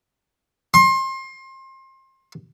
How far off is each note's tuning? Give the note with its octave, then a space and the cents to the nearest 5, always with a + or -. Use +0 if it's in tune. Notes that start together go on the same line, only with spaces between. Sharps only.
C6 +30